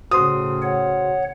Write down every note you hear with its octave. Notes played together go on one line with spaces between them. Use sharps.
A2 C#3 F#4 C5 C6 D#6
C#5 F#5